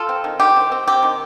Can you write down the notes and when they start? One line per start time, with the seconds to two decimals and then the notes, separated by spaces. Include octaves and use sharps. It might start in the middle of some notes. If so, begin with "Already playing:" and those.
Already playing: F4 A4
0.09 C4
0.24 D#3
0.40 D#3 G4
0.56 C4
0.72 C4
0.87 C4 G4
1.03 D#3